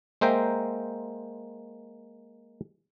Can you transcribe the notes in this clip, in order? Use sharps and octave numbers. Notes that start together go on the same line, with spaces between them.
G#3 A#3 C5 E5 G5 A#5